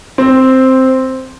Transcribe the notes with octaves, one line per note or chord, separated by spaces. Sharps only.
C4